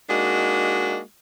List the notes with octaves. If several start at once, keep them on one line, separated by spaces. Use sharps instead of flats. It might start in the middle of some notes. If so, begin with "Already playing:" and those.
G#3 A#3 D4 D#4 F#4